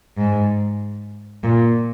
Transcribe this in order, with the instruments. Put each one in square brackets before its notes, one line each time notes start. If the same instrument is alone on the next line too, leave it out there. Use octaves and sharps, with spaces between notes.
[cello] G#2
A#2